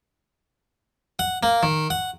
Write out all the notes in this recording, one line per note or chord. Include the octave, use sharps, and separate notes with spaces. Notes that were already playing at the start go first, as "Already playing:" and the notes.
F#5
A#3
D#3
F#5